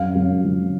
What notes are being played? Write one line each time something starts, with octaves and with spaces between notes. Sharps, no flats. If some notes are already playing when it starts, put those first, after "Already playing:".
Already playing: F#2 F5
F#2
F3